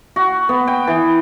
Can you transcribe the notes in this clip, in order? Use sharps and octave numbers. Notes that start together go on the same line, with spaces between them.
F#4
B3
G5
E3